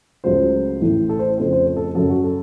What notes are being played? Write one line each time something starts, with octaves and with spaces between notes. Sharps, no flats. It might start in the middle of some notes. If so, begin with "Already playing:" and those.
C#2 C#3 F#3 A3 C5
A1 A2 A3
A4
C5
F2 C#3 A3 C4 C5
C5
C5
A4
F#2 C#3 F#3 A4
F#4
A4